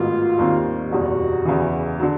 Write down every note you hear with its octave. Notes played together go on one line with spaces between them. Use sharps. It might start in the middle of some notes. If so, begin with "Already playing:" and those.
Already playing: A1 G#2 D#3 F#3 B3 F4
D#2 D#3 G3 C4
F#1 E2 B2 G3 F#4
E2 C#3 E3
D3 F#3